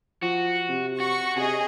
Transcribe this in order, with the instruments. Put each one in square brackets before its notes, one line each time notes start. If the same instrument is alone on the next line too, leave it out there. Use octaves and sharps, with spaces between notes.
[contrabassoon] F3 [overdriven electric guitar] F#4
[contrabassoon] C3
[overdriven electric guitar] F#4 [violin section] C#6
[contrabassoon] C3 [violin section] G#4 D#5